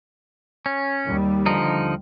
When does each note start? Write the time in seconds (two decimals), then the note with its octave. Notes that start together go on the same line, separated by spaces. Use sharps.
0.66 C#4
1.05 D#2 G3
1.46 D3 F3 D#4